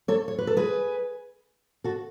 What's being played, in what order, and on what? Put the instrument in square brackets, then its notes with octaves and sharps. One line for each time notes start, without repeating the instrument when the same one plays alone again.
[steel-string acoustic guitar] A4 C#5
C#5
B4
A4
G#4 B4
F#4 A4